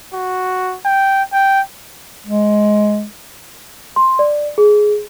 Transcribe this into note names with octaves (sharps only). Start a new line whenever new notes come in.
F#4
G5
G5
G#3
C6
D5
G#4